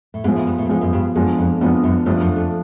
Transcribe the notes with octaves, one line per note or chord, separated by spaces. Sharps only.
A2
G#2 F3 G#3 B3
A2
G2
A2
G2
G#2 F3 G#3 B3
F#2
G2
F#2 F3 G#3 B3 D4 F4
F2
F2 F3 G#3 B3 D4 F4
F#2
G2 F3 A3 D4
F#2
F2